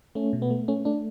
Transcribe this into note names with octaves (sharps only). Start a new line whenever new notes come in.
A3 C#4
B2
B3
A3
A3 C#4
A3 D4